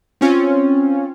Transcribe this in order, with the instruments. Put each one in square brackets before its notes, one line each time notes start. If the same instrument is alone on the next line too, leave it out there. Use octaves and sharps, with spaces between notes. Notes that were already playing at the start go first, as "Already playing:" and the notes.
[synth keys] C4 C#4 F4